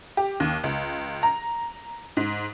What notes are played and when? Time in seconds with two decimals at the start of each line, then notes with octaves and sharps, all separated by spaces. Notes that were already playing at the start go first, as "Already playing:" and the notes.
0.17 G4
0.40 D#2
0.64 C#2
1.23 A#5
2.17 G#2